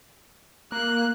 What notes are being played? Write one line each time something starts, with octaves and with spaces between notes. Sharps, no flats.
A#3 F#6